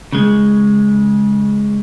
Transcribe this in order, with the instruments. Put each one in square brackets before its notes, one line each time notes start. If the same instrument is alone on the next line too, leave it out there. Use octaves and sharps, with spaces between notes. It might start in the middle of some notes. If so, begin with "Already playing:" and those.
[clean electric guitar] C#3 G#3